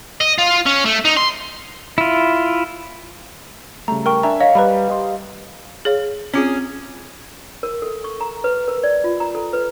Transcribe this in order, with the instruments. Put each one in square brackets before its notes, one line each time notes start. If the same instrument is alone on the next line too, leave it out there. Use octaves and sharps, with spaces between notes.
[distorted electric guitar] D#5
F4
C#4
A3
D#4
C6
[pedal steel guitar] E4 F4
[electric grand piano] C#3 G3 A3 [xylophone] A#5
[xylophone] A#4 G5 C#6
[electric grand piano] D4 E5 G#5 [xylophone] A#5
[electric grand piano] C#5 [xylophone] D#5 [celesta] F5
[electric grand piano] G3 [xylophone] B4 A#5 B5
[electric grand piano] G4 D#5 C6
[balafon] G#4 C#5 F5
[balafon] C4 F4 [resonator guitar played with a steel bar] C#4 G#4
[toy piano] A#4
A4
C#6
A#5
B4
A#4
D5
F4
A#5
A4
B4